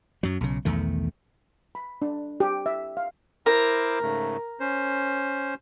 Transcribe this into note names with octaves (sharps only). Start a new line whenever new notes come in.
F#2 F#3
B1 C#3
B1 E2 D#3 A3
B5
D4
G4
E5
F5
E4 A#4 C5 D6
G#2 C#3 A3
C#4 C5